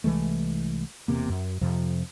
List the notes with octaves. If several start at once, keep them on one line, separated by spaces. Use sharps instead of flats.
C2 E3 G#3 A3
E1 E2 C3 A#3
F#2
F2 C3 F3